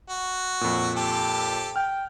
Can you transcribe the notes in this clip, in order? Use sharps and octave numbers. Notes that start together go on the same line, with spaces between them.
F#4
F2 A#2
G4 A4
G5 F6